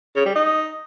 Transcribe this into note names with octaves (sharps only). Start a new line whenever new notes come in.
C#3
G3
D#4